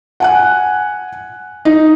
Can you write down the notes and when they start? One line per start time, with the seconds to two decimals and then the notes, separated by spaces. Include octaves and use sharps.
0.20 F#5 G#5 F#6
1.65 D#4